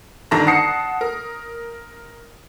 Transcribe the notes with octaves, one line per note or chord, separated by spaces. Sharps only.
G1 D#3 D4 A4 A#5 A#6
F#5 A5 D#6 C7 C#7
A#4